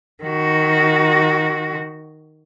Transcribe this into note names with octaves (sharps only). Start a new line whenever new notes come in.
D#3 F#4